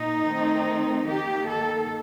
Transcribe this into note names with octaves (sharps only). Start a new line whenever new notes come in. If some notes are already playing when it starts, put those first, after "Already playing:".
Already playing: A#2 D#4
D#3 A3 C4
D#3 A#3 G4
A4